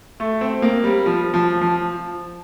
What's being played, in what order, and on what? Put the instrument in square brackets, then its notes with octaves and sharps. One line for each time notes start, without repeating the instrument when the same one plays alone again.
[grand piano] A3
C4
A#3
G3
F3
F3
F3